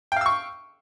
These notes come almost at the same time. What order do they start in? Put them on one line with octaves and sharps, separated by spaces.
G5 F5 E6 C#6